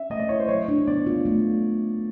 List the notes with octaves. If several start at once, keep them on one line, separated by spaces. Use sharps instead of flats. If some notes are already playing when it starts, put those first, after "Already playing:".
Already playing: C#4 E5
A3 D#5
D5
E4 C#5
C5
F#3 C#5
D4
B3 D5
F4
A3